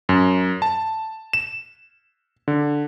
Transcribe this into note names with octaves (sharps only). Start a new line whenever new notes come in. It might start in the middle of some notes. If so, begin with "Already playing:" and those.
F#2
A5
E7
D3